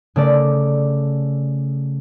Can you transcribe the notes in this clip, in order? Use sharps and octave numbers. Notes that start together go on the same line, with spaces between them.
C#3 A3 D5